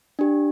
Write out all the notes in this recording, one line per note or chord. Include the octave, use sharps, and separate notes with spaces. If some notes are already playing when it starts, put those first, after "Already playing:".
D4 G4